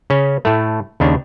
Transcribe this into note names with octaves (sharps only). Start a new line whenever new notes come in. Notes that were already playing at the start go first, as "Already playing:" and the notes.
C#3 C#4
A2 A3
D#2 C#3 D4